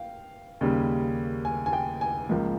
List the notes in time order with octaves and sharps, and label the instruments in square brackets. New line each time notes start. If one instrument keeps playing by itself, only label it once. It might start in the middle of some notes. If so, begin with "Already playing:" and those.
Already playing: [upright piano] F5 G5
D#2 C#3 G3
G#5
G#5
G5
G#5
C#2 C#3 F3 A#3